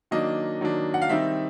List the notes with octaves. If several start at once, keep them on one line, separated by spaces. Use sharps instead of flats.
D#3 F#3 A#3 D4 D#5
D#3 F#3 A#3 D4
F#5
F5
D#3 G3 C4 D#4 E5